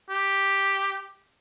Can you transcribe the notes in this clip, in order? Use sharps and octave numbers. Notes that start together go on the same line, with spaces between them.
G4